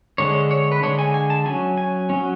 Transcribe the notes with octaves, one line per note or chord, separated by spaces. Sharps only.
D3 G#3 D4 C#5
C#5
B4
D3 G#3 D4 C#5
G#5
G#5
A5
F#3 C#4 G#5
G#5
F#3 C#4